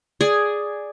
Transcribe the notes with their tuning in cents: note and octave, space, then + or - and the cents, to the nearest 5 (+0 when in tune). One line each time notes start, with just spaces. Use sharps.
G#4 +0 D5 +0